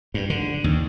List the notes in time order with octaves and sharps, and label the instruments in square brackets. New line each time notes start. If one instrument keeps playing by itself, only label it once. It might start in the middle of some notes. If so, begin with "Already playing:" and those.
[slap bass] G2
D3
D#2